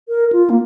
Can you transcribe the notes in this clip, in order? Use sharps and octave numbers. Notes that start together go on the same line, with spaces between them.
A#4
F4
A#3